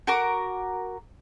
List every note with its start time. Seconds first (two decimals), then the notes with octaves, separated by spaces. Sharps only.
0.07 F#4 A#4 D6